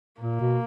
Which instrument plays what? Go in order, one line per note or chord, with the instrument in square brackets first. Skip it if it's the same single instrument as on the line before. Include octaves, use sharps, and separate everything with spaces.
[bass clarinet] A#2 [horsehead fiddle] A#3
[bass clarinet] B2